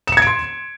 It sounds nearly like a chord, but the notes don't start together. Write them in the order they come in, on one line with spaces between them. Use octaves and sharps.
E7 C#7 G#6 D7 C6